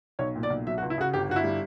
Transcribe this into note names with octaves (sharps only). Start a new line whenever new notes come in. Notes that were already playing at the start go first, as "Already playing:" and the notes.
B1 C#5
A#2
D5
B1
F#3 E5
F#4
C#2
E4
C#3 F#4
G1 G4
G1 F#4
E4
G3